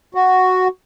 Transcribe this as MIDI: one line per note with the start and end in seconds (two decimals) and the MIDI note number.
0.15 0.68 66